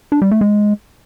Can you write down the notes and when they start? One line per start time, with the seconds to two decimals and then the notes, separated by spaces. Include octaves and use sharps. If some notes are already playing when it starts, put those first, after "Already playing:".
0.12 D4
0.22 G3
0.31 A3
0.41 G#3